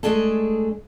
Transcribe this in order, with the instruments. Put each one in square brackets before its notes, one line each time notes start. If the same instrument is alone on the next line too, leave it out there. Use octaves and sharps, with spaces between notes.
[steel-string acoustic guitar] G#3 A3 D4 G#4 A4